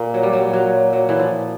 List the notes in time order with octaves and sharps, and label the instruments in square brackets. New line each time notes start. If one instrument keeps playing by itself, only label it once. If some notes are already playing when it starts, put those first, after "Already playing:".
Already playing: [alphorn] A#2
[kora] F#3
G3
F#3
F#3
F#3
E3
F3